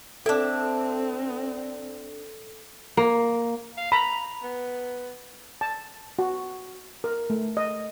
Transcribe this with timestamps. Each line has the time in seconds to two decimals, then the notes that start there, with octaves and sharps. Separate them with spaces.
0.26 C4 D4 A4 E5
2.97 A#3
3.77 F5
3.92 A#5 B5
4.43 B3
5.61 A5
6.19 F#4
7.04 A#4
7.30 A3
7.57 D#5